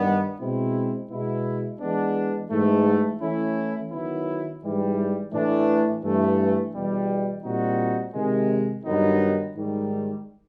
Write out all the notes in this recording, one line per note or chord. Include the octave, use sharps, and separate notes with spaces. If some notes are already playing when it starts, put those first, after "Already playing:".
Already playing: G2 D#3 G3 B3
B2 G#3 C4 E4
B2 G#3 B3 E4
E3 G#3 B3 D4
G#2 E3 A3
E3 A3 C#4 E4
D#3 F#3 B3 E4
G#2 E3 G3
A2 E3 A3 D4
G2 E3 A3
E2 B2 G3
A#2 G3 C4 D#4 F#4
C3 D#3 G#3
G2 D#3 F#3 B3 D#4
G#2 D#3 G3